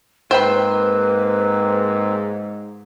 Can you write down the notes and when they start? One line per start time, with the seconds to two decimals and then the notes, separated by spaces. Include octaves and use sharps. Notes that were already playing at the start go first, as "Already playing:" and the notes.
0.31 G#2 A#3 C4 B4 C5 G5 B5